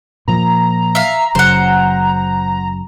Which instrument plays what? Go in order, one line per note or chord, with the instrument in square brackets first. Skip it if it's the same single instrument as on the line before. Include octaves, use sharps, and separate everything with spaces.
[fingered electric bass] A#2 F3 [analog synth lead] A#5
[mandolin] E5 F5
[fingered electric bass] F#1 C#3 F#3 [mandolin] C5 F#5